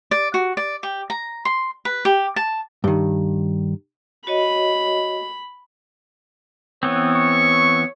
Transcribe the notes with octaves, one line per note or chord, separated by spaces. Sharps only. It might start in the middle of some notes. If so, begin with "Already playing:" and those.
D5
F#4
D5
G4
A#5
C6
B4
G4
A5
G2 D#3
F#4 C#5 D#5 B5
E3 B3 C4 C#5
C#6